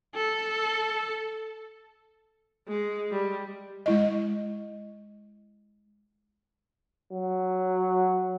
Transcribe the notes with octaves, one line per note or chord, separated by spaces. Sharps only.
A4
G#3
G3
G#3 E4 D#5
F#3